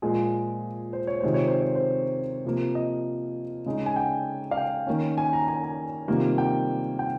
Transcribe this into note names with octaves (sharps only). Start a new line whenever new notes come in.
A#2 F3 G#3 G#4
C5
C#5
C3 D#3 G#3 C4 F4 C5
C#5
C5
C#5
C5
C3 F3 A#3
D#5
C#3 G#3 D#4
G#5
G5
F5
G5
D#3 A#3 C#4
G#5
A#5
G#5
G#5
C3 D#3 G3 A#3 F4
G5
G5